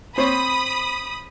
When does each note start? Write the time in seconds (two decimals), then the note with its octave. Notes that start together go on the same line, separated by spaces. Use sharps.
0.18 C4 C5 C#5 B5 D#6